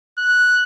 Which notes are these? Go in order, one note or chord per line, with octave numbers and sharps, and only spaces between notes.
F#6